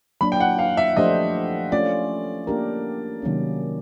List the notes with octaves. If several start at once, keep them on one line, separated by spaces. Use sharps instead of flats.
F#3 A#3 D4 B5
G5
F#5
F5
E5
F3 A3 D4 G4 C5 D#5
A3 C#4 F4 D5
A#3 D4 G4 A#4
C3 D#3 F#3 A#3 C#4